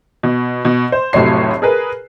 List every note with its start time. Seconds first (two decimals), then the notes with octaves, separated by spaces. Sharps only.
0.23 B2
0.65 B2
0.92 C5
1.13 F1 A2 C3 F#3 C#5 C7
1.62 G#4 A#4 B4